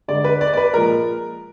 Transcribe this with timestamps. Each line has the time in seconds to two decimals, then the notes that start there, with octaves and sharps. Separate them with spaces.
0.08 D3 G#3 D5
0.24 B4
0.41 D5
0.54 D5
0.57 B4
0.73 A#2 F3 G#3 A#4